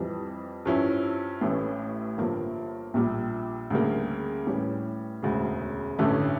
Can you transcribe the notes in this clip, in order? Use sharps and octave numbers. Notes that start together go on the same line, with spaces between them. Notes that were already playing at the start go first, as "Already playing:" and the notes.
Already playing: F2 E3 G3
G2 F3 C#4 E4
A1 A2 E3 A3 C#4
G1 G2 F3 A#3
A#1 A#2 G3
D2 C#3 G3 A#3
A2 E3 G3 C#4
E1 D2 C#3
A1 G2 D3 A3 C#4